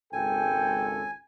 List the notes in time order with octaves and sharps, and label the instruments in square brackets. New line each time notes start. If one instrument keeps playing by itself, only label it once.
[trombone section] G#1 C#2 A4 [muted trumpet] G5 [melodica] G#5